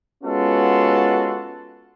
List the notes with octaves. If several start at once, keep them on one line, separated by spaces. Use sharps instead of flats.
G#3 B3 C#4 F4 F#4 A4